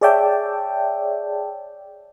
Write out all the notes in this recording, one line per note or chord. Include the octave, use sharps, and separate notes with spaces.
G#4 C#5 D5 E5 G5 A5